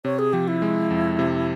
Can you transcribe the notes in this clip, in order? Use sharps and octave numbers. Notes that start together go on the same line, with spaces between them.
C3 C#5
G#4
F3 G4
E4
G#3
F2
C3